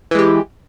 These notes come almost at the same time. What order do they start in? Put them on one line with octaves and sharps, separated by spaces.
E3 G#3 G4